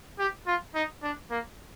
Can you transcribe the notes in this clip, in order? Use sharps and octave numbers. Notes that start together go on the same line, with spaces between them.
G4
F4
D#4
D4
A#3